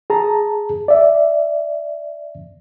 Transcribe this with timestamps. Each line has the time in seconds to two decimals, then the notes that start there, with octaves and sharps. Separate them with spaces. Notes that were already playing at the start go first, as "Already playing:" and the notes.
0.10 G#4 A5 A#5
0.88 D5 E5